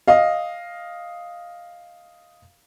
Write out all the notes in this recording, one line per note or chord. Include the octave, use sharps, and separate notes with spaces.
D#5 F5